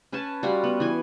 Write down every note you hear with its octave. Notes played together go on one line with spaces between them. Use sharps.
C#4 B4 G#5 A5
G3 F4 F#4
B3
E3 G#5